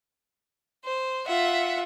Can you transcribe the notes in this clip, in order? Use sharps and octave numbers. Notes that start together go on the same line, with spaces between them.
C5
F4 E5 F#5